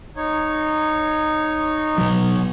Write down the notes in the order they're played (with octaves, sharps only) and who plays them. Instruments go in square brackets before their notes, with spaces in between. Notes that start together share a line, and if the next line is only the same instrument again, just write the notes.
[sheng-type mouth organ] D#4 C#5
[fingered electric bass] B2 F#3